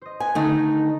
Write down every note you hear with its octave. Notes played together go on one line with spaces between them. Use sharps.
C5 D#5
A#4 B4 G#5
D3 A3 D#4